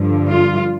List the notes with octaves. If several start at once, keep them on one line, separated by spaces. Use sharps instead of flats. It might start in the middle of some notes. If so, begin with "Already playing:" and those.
Already playing: G2 D3 F3
F4